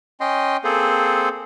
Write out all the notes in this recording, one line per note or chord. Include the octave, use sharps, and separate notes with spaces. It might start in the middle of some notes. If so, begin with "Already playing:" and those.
C#4 D#5 G5 C6
A#3 C4 G#4 A4 C5